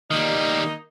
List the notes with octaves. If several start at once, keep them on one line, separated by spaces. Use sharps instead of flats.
D#3 G3 A#3 D#4